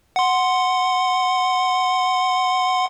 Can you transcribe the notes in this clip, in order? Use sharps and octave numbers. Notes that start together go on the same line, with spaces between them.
F#5 C6